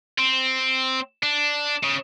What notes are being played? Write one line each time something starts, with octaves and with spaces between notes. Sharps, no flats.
C4
D4
C#3